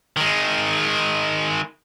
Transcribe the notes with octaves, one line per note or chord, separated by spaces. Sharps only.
D#3 G#3